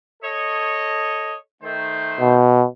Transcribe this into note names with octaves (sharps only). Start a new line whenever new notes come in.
A4 C#5 D#5
D#3 A3 C5
B2